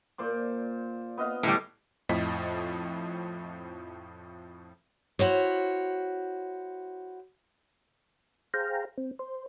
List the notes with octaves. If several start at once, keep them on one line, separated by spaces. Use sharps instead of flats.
A#2 C5 D5
B3 D#5 F5
A2 G3
F2 A2 F3 D#5 B6
E4 F#4 C5 C#5
G#4 C5 F5 G5 A#5
C4
C5